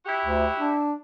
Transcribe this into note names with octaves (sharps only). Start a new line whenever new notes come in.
E4 F#4 G4
D2
D4